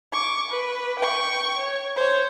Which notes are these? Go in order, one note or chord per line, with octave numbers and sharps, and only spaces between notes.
C#6 D6
B4
G5 C#6
C#5
C5 C#5